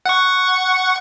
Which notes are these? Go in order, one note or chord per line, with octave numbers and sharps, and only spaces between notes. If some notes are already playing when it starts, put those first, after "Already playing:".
F#5 C#6